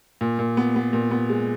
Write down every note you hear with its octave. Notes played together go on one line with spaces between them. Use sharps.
A#2
A#2
B3
B3
A#2
B3
G#3